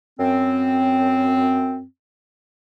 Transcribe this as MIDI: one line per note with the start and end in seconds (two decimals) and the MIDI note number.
0.19 1.83 42
0.19 1.83 60